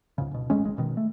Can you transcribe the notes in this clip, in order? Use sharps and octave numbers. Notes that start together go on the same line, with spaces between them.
C#2 G#2 C#3
D1 B2
A1 A#2 G#3 C#4
G#1 G#3
G#1 B2 D#3
A3